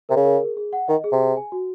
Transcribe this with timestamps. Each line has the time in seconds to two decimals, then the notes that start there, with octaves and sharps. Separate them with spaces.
0.09 C3 A#4
0.16 C#3
0.25 A#4
0.40 G#4
0.57 G#4
0.73 F#5
0.88 D#3 D#5
1.04 G#4
1.12 C3
1.20 G#4
1.37 G#5
1.52 F#4